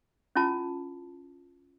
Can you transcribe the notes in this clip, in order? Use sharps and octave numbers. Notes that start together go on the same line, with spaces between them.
C#4 E4 F4 A5